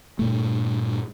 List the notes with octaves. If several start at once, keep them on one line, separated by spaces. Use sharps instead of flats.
G2 A#2 A3